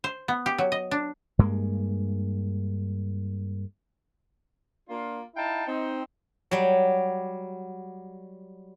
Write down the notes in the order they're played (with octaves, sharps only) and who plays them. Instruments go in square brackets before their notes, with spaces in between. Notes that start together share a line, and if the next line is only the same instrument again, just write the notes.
[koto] C5
B3
G4
F#3
D#5
D4
[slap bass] G2 G#3 A#3
[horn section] A#3 D4 F4
D#4 E4 F5 G5 A5
C4 D#4
[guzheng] F#3 G3